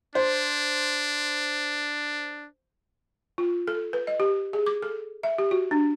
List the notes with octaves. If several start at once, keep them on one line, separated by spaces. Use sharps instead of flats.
D4 C5
F4
A4
B4
D#5
G4
G#4
D6
A4
E5
G4
F#4
D4